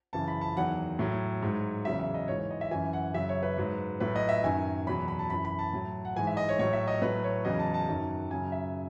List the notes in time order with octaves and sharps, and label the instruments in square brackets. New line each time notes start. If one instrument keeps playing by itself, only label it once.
[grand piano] F#2 C#3 E3 A5
B5
A5
E2 D#3 F#3 F#5
A2 F#3
G#2 F#3
E2 C#3 F#3 E5
E5
D#5
G#2 C#5
E3
C#5
D#5
E5
F#2 E3 G#5
F#5
F#2 C#3 F#3 E5
C#5
B4
G#2 F#3
A2 F#3 B4
D#5
E5
F#2 D#3 F#3 G#5
E2 B2 F#3 B5
B5
A5
F#2 E3 B5
B5
A5
A2 F#3
F#5
G#2 E3 G#5
E5
D#5
C#5
A2 F#3 C#5
E5
D#5
A2 F#3 B4
C#5
E2 C#3 F#3 D#5
A5
A5
F#2 D#3 F#3
F#2 C#3 F#3 G#5
E5